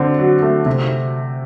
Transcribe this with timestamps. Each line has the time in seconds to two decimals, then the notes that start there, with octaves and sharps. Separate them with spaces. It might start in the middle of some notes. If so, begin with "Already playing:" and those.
Already playing: D3 C4
0.19 F#3
0.42 A3
0.66 C3